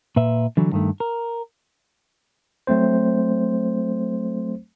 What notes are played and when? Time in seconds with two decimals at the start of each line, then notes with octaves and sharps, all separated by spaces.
0.16 A#2 B4 E5
0.57 D3 E3 F#3
0.72 G2 D#3 A3
1.00 A#4
2.67 F#3 A3 C4 C5